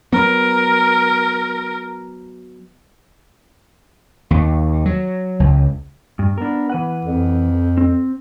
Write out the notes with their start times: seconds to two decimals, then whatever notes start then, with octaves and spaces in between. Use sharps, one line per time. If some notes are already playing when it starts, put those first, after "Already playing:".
0.13 F#3 B3 A#4
4.31 D#2
4.86 F#3
5.40 C#2
6.19 G2
6.38 B3 D4 A#4
6.70 E3 B4 F#5
7.05 F2
7.78 C4